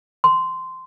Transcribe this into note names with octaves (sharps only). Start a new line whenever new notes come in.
C6